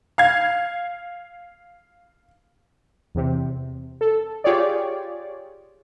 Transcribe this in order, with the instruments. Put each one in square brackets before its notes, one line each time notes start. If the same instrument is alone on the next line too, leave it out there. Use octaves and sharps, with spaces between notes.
[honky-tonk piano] F5 G#6
[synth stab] E2 C3
A4
F4 G4 G#4 C#5 D5